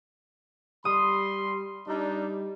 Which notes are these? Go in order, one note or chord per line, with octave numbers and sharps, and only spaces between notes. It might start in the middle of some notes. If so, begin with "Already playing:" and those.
G3 B5 C6 D#6
G3 D4 D#4